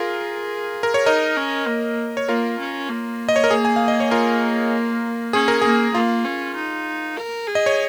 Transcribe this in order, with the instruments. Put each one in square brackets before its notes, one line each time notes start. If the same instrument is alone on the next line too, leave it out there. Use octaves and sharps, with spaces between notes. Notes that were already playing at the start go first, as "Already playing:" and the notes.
Already playing: [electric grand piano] F4 A#4 [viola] G#4
[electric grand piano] A#4
C#5
[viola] D#4 [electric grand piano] A#4 D#5
[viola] C#4
A#3
[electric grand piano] C#5
[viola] A#3 [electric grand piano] F4 A#4
[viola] C#4
A#3
[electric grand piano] D#5
C#5
A#4
[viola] A#3 [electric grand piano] G#4
[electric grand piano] G#5
F5
D#5
C#5
F4 A#4
[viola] C#4 [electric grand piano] G#4
[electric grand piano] A#4
[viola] A#3 [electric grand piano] G#4
[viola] A#3 [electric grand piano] F4
[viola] C#4
D#4
A#4
G#4
[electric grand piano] D#5
C#5